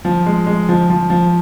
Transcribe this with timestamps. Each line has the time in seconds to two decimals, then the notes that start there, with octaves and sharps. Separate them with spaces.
0.05 F3
0.26 G#3
0.46 G#3
0.69 F3
0.90 F3
1.10 F3